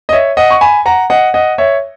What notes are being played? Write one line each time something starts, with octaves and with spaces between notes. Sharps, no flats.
D#5
C#5 E5
D#5 F#5
C#6
G#5 B5
F#5 A#5
D#5 F#5
D#5 F#5
C#5 E5